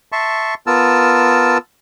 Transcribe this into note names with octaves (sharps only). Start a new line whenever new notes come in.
E5 A5 C6 C#6
B3 F4 A#4 A5 E6